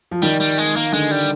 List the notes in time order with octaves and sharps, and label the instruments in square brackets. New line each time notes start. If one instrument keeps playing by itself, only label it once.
[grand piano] F3
[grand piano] D#3 [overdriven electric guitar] G3
[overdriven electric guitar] G3
G#3
A#3
[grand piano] D3 [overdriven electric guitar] G#3
[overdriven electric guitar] G3